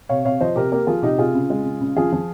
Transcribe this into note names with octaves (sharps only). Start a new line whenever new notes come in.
C3 C#5 F5
C3 C#5 F5
F3 C5 D#5
C3 G4 A#4
A#3 G4 A#4
F3 F4 G#4
C3 D#4 G4
C3 F4 G#4
C#3
G#3
C#3
C#3
F3 F4 G#4
F3